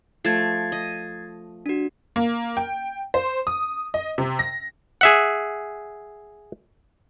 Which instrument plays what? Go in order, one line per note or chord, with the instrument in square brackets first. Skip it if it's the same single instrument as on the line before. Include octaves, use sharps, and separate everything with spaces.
[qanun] F3 A3 A5 [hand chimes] G#6 A6 C7
[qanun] D#5
[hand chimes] D4 F#4
[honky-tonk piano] A#3
G5
C5
D#6
D#5
C3
A#6
[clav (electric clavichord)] G#4 E5 F#5